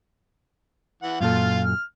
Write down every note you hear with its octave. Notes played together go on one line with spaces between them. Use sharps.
E3 F#5
F#2 A#2 F4 A4 F5
F6